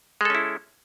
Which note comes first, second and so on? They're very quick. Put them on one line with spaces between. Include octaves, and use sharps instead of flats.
G#3 A4 C#4 E4